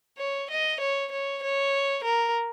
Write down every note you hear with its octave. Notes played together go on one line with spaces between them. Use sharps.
C#5
D#5
C#5
C#5
C#5
A#4